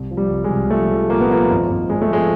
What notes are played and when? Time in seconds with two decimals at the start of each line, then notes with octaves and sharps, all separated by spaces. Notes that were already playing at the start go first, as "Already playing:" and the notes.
Already playing: C2
0.11 F3
0.17 G3
0.30 C2
0.44 G#3
0.51 C2
0.70 F3 A3
0.91 F3
1.10 A#2 A#3
1.20 B3
1.30 F3 A#3
1.50 G#1
1.70 G#1
1.89 G#1 G#3
2.02 A3
2.10 F3 G#3